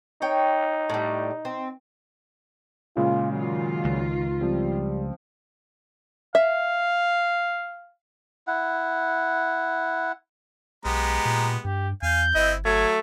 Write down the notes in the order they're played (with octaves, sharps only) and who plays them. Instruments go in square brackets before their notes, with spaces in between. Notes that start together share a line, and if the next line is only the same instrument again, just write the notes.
[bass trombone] D#4 [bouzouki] C#5 G5
[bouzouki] A2 G3
C4
[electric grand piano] A#2 C#3 G#3 [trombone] F4
[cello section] D#3 F4 [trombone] F#3
[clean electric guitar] C#2
[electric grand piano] F3 C4 [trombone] G3
[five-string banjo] E5 [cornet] F5
[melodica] E4 F#5
[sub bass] B1 [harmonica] G#3 B3 G4 [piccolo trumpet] A#5
[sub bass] A#2
[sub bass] G2 [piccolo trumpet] G4
[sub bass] E2 [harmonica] F5 G#5 [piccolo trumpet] G6
[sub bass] G1 [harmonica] C4 E4 [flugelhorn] D#5
[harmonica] F#3 [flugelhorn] A3 [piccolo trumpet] G#6